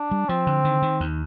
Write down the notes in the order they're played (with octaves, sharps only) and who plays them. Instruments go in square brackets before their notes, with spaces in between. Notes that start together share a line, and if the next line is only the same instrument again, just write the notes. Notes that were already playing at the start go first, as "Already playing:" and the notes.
Already playing: [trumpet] D4
[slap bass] G3
[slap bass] F3 [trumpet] C4
[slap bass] D3
D#3
D#3
D#2